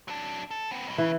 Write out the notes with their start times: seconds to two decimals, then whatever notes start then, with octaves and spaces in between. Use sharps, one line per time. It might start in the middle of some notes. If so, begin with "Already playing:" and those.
0.08 F#3 D4
0.51 A4
0.71 B3 C4
0.87 B1 B2
0.98 C#3 E3